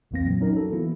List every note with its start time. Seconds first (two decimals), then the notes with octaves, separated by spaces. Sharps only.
0.11 B1 F2 E3 A#3 C4 A#6
0.26 A#2 F#3
0.40 F#3 C#4 D#4 A#4
0.57 F#4 A4
0.72 E3 A#3 B3 E4